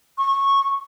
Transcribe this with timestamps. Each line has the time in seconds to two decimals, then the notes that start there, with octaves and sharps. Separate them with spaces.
0.18 C#6